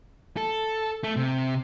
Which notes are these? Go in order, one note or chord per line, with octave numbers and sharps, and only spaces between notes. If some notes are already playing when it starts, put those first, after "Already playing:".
A4
A3
C3